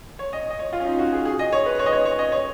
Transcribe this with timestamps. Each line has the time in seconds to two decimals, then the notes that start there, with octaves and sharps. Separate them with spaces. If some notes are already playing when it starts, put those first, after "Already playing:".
0.19 C#5
0.33 D#5
0.50 D#5
0.59 C#5
0.73 F4
0.80 C#4
0.86 D#4
0.99 F#4
1.12 G#4
1.25 G#4
1.39 D#5
1.53 C#5
1.66 B4
1.79 C#5
1.86 D#5
1.92 C#5
2.05 C#5
2.19 D#5
2.32 C#5